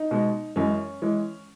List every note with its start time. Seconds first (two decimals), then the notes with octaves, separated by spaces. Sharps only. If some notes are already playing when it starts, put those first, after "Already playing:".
Already playing: D#4
0.11 B2 G#3
0.56 F#2 E3 G#3 C#4
1.02 E3 G#3